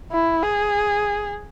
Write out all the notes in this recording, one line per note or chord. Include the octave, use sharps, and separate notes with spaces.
E4
G#4